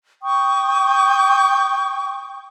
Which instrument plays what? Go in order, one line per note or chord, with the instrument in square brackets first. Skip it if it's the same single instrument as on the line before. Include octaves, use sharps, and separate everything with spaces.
[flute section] G5 C#6 D#6